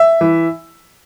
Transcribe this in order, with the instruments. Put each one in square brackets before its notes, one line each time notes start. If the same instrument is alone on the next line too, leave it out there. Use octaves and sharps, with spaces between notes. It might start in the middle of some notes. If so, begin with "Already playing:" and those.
Already playing: [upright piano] E5
E3